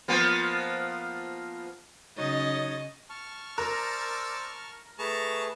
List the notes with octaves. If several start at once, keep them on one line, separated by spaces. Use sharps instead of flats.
F3 A#3 B3
C#3 F#3 D#4 C#5 D#5 A6
A5 C#6 F6
A#4 C5 D5 E6
A3 G#4 B4 A5 A#5 C#6